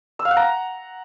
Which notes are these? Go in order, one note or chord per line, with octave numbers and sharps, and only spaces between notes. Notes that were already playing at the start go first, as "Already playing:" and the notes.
E6
F5
F#5
A#5